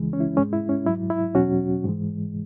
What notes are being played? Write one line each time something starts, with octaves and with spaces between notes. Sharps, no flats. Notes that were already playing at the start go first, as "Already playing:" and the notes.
Already playing: C#2 C#3 E3 G#3
C#4
E4
G#2 G#3 C#4
E4
C#4
G#2 F#3 E4
E4
E2 B2 F#3 C#4 F#4
G#2 E3 G#3